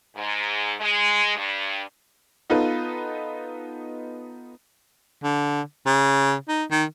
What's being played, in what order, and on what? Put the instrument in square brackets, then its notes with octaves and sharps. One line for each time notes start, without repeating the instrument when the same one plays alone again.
[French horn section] G#2
G#3
G2
[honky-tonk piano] B3 D#4 F4 A4 B4
[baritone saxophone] D3
C#3
D#4
D#3